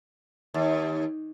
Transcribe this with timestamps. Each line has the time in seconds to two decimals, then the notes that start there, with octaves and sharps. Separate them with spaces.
0.54 D#2